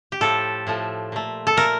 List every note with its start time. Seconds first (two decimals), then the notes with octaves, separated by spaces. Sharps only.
0.12 G4
0.21 A2 F3 A3 A4
0.67 A2 F3 A3
1.12 A#2 A3
1.47 A4
1.57 A#2 A3 A#4